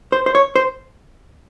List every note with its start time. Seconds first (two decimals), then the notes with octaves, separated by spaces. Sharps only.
0.12 C5
0.26 C5
0.35 C#5
0.56 C5